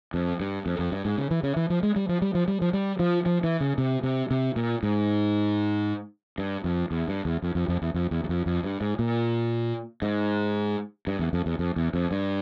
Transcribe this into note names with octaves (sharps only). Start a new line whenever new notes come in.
F2
G2
F2
F2
G2
G#2
C#3
E3
C#3
E3
F3
G#3
G3
F3
G3
F3
G3
F3
G3
F3
F3
E3
C#3
C3
C3
C3
A#2
G#2
G2
F2
E2
G2
E2
F2
F2
F2
E2
F2
E2
E2
F2
F2
G2
G#2
A#2
G#2
G2
E2
F2
E2
F2
E2
F2
G2